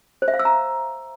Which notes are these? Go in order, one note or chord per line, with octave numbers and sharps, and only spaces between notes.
C5
E5
F5
E6
A#5